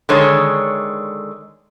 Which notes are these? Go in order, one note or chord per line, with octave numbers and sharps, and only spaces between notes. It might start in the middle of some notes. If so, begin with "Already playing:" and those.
D3 D#3 G#3 C#5